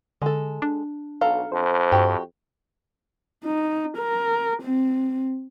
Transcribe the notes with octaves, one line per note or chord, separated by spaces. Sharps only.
D3 G#3 A4
D4
B1 A4 F5 A#5
F2 C5
G2 F#4 G4
D#4
A#4
C4